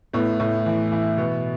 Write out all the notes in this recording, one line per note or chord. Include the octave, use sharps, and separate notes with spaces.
A2 B3
A2
E3
E3
B2 B3